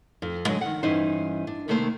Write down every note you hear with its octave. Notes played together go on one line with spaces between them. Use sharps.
F2
D3 F#3 G#3
D#3 F#5
G2 E3 C#4 D#4 C5
D4
C3 D#3 A3 A#3 A4 C5